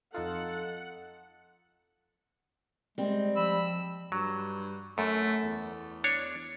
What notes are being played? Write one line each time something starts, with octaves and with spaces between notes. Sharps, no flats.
F2 D#4 F4 A4 F#5
G3 G#3 C4
F3 B5 E6
G2 F#3
F#2 A3
E2
D4 C#5